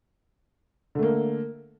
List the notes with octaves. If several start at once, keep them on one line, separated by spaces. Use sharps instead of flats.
D3 A3 A#3